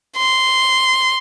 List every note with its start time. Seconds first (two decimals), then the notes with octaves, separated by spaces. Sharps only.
0.18 C6